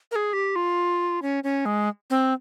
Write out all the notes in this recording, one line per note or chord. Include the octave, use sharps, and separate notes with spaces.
A#4
G#4
G4
F4
C#4
C#4
G#3
C4